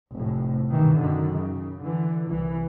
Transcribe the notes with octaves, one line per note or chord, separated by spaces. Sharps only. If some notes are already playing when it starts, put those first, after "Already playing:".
F1 A2
G2 B2 D#3 E3
F#2 D3 D#3
C#3
D3 E3
C2 E3